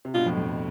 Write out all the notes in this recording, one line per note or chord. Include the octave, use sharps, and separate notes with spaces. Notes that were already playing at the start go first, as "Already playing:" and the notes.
C3
G2 B2 F4
F2 A2
F2